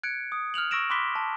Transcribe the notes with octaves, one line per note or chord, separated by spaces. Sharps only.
F#6 G#6 C#7 D7
D#6
F6 F#6 F7 F#7
C#6 E6 A#6 D7 E7
B5 C6 D6 F#6 B6 G7
A5